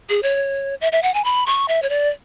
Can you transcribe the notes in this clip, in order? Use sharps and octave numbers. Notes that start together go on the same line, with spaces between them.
G#4
C#5
E5
E5
F#5
G#5
B5
C#6
E5
C#5
D5